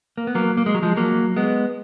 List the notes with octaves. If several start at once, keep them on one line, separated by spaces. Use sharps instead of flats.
A#3
B3
F#3 A#3
A#3
G#3
F#3
F3 G#3
F#3 A#3
G#3 B3